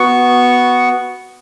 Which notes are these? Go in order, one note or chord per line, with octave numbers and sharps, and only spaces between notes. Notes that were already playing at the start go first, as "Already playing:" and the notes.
Already playing: B3 F#4 C#6